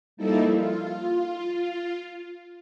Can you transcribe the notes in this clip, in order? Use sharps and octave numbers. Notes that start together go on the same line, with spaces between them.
F3 G3 A#3 D#4 E4 A4
F4